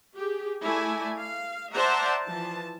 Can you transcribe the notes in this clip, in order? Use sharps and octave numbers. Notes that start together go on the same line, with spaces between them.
G4 G#4
A3 E4 D5 G#5
F5
C5 D5 E5 F#5 A5 A#5
E3 F3 A5